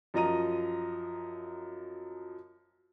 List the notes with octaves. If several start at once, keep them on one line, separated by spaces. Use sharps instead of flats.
F#2 F3 D#5 A#5 D#7